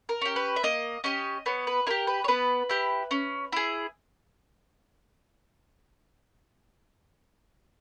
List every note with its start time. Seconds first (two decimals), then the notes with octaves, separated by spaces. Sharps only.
0.09 A#4
0.22 C#4 G4
0.36 B4
0.56 E5
0.64 A#3 D#5
1.04 C#4 G4 D#5
1.46 B3 C#5
1.67 B4
1.87 E4 G4 A#4
2.07 B4
2.24 C#5
2.28 B3 B4
2.69 E4 G4
3.11 C#4
3.52 E4 G#4